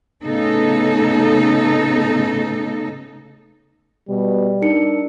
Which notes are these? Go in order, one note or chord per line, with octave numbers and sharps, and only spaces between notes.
A2 C#3 B3 D#4 A4
B2 G3
D4 D#4 A#4 C#7